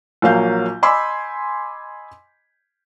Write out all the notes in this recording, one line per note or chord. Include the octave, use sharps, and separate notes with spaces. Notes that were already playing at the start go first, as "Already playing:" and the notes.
A#1 F#3 A#3 F5 G6
D#5 G#5 B5 C6 D6 E6